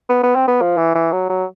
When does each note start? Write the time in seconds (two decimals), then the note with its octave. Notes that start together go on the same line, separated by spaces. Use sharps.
0.09 B3
0.23 B3
0.35 C4
0.48 B3
0.61 F3
0.77 E3
0.95 E3
1.13 F#3
1.30 F#3